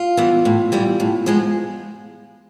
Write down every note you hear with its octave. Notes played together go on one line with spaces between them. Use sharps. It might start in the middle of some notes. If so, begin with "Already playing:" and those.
Already playing: F4
E3 G3 B3
A2
E3 G3 B3
A2
F3 G#3 B3